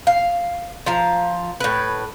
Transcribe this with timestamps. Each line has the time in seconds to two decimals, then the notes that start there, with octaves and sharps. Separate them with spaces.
0.07 F5
0.86 F3 F5 A#5
1.60 A2 B4